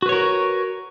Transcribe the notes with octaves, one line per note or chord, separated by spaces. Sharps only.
F#4 A#4 B4 C#5